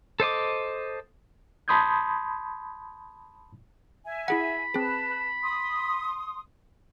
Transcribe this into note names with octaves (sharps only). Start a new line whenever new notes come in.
A4 C5 D#5 D6
A5 B5 C6 D#6 G6 G#6
E5 G#5
E4 G#4 F#5 B5
C4 G#4 B4 A5
C6 D#6